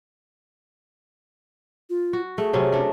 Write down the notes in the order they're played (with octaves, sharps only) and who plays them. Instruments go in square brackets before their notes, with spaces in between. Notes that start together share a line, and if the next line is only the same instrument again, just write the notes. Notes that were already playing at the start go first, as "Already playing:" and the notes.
[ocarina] F4
[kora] F#4
[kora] A3 [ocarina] G#4
[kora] C3 F#3 C#4
A3 D4